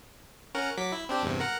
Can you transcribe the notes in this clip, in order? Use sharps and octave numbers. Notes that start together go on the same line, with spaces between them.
C#4 A#4 F#5
F#3 D6 B6
E4
C4 D4 G4
E2 G2 C3
A#4 F#5